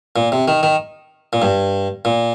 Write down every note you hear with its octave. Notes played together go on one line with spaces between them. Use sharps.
A#2
C3
D#3
D#3
A#2
G2
A#2